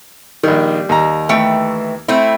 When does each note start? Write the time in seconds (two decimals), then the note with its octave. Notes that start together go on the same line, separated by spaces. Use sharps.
0.43 A#1 D#3 G3
0.89 D#2 A#5
1.29 E3 A3 G5
2.08 A3 C4 E4